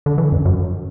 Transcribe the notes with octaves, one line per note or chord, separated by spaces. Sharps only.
D3
E3
F#2
F#2